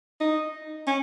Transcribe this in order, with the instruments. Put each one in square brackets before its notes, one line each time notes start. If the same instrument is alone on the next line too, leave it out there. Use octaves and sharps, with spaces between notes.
[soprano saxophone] D#4
C#4